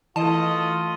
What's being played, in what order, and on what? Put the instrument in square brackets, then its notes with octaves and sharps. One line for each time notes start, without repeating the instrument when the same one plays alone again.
[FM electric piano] E3 [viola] A3 D#5 [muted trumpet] F4 [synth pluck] A5